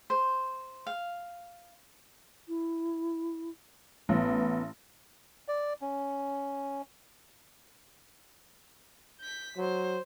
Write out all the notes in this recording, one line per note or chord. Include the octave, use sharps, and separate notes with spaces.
C5
F5
E4
A1 B3
D5
C#4
G6 B6
F#3 C5